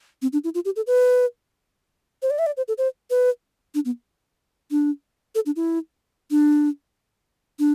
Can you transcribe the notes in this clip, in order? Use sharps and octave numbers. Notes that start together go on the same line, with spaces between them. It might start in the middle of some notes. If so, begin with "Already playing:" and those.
C4
D4
E4
F4
G4
A4
B4
C5
D5
E5
D5
C5
A4
C5
B4
D4
B3
D4
A4
D4
E4
D4
D4